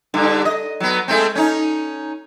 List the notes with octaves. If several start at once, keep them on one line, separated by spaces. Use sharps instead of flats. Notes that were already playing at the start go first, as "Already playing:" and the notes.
G2 D3
D#5
F#3 B3
G#3 A3 C4
C#4 D#4